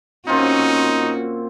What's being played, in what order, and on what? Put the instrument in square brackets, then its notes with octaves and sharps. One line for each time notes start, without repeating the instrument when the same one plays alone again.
[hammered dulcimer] A#2 C4 F4 [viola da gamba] C#4 F#4 [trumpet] D#4